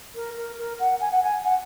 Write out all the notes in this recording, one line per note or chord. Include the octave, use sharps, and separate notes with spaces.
A#4
A#4
A#4
F#5
G#5
F#5
G#5
F#5